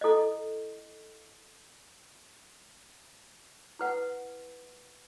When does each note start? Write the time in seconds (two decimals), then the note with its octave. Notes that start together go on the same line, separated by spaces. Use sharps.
0.01 E4 A4 D#5
3.79 E4 B4 F#5